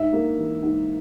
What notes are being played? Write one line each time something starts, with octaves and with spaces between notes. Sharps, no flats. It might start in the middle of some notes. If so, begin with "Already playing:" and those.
Already playing: G#2 E5
A#3
E3
G#2